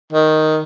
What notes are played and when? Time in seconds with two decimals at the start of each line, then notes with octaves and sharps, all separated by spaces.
0.12 D#3